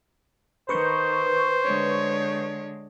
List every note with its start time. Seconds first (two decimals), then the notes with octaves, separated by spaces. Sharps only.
0.69 D#3 B4 C5 C#6 G6
1.64 D3 G#3 C#5